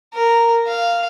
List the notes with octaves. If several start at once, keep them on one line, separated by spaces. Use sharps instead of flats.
A#4
F5